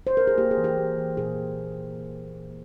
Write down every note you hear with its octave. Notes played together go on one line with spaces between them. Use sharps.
C5
A#4
G#4
A#3 G4
G#4
E3
G4
A#3
E3
A#2 G#4